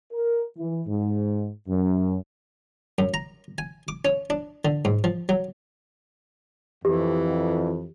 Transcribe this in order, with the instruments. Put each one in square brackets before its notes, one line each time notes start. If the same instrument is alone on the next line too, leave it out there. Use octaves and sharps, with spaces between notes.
[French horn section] A#4
E3
G#2
F#2
[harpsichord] F#2
A#5
G#5
D6
C#4
D4
D3
G#2
F3
F#3
[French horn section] F2 [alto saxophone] E3 [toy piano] G4